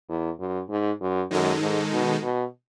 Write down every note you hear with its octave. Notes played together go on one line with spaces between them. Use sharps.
E2
F#2
G#2
F#2
F#2 D#3 G#3 D#4 A4
G#2
B2
B2